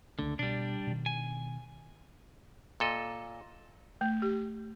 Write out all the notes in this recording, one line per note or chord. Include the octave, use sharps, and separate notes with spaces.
C#2 D3 A3
B2 G3 D4
B2 D#3
G#5
A#2 A4 D#5
A3
G4